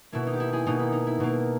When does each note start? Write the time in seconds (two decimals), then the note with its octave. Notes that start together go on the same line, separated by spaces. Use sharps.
0.12 B2 A#3 E4
0.27 D#4
0.33 G4
0.40 E4
0.53 E4 G#4
0.66 B2 A#3 D#4
0.79 E4
0.92 D#4
1.07 E4
1.20 B2 A#3